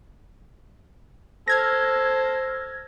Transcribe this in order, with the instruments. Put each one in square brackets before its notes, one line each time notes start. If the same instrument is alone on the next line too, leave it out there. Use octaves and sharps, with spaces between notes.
[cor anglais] A4 [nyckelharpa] C5 [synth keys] F6 G#6 A#6